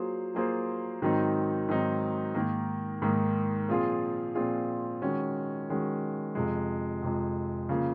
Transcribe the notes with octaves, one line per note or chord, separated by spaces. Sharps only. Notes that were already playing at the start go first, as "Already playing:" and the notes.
Already playing: F#3 A#3 F4 G#4 C5
F#3 A#3 F4 G#4 C5
G#2 D#3 F#3 C4 D#4
G#2 D#3 F#3 C4 D#4
G#2 D#3 A#3
G#2 D#3 A#3
A#2 F3 C4 F4 G#4
A#2 F3 C4 F4 G#4
D#3 G#3 C#4 F#4
D#3 G#3 C#4 F#4
F2 C3 F3 G#3
F2 C3 F3 G#3
C#3 F3 A#3